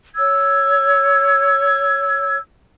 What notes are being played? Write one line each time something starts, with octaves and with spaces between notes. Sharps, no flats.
C#5 E6 G#6